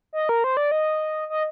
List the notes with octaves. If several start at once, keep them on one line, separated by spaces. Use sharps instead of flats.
D#5
A#4
C5
D5
D#5
D#5